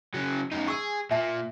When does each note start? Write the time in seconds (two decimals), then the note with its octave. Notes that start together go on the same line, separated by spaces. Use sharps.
0.14 C#3 F#3
0.51 F#2 D#4
0.68 G#4 C#6 E6
1.11 A#2 E5 A5